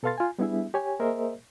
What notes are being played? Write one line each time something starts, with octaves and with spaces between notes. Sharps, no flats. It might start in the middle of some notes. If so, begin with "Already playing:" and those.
B2 A4 B4 F5 C6 A6
F4 G#5
G3 B3 D4 E4 G#4 E5
G4 C#5 G#5
A#3 G#4 A#4 C5 D#5 E5